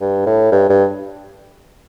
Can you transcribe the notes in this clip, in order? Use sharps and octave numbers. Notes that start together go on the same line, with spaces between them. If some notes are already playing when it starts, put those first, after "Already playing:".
G2
A2
G2
G2